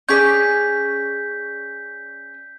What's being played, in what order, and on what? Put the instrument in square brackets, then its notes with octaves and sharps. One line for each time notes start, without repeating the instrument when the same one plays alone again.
[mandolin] C#4 G#4 D5 [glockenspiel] G6 B6